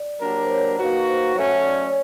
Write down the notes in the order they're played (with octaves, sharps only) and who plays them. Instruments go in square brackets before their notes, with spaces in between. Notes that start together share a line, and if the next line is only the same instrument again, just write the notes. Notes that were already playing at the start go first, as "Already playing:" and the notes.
Already playing: [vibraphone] D5
[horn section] F#3 A#3 D4 G4 A#4
[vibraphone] C5
C#5
[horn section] A#3 D#4 F#4 [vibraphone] B4
[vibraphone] C5
[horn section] F#3 A3 C#4 [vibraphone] C#5
[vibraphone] D5
C#5